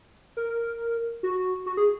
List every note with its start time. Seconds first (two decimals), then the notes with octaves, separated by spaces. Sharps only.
0.37 A#4
1.23 F#4
1.66 F#4
1.77 G#4